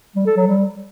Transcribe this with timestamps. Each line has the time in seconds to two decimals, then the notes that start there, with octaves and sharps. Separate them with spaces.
0.16 G3
0.26 A4
0.37 F#3
0.47 G3